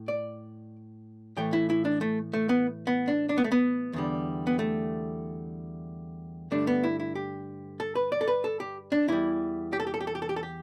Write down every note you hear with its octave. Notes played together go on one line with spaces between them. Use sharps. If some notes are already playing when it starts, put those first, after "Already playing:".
Already playing: A2
D5
A2 E3 A3 G5
E4
E4
D4
A3
A3
B3
B3
D4
D4
B3
A3
B3
E2 D3 G3
B3
A3
G2 D3 A3 D4
B3
E4
E4
G4
A4
B4
D5
A4
B4
A4
G4
D4
E2 E3 G3 E4
G4
A4
G4
A4
G4
A4
G4
A4
G4
A4
G4